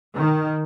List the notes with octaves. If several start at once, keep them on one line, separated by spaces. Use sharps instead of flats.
D#3